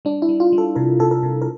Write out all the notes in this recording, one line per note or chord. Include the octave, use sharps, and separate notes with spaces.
G3 D4
E4
G3
F4
G3
A4
C3 A#4
C3 A4
A#4
C3
A#4